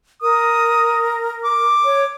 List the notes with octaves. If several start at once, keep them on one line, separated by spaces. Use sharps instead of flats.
A#4 D#6
D6
C#5